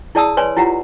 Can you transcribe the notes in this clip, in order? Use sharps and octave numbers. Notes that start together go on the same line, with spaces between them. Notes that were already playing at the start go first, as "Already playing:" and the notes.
E4 G#4 D5 A5 D#6 E6
B4 C#5 D5 G#5 C6
E4 F4 G4 F#5 A#5